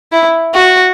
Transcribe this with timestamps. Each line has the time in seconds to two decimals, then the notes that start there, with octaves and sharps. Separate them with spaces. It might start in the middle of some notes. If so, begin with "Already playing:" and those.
0.12 E4
0.54 F#4